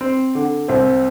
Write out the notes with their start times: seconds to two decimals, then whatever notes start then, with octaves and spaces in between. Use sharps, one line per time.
0.01 C4
0.35 D3
0.68 C2 C4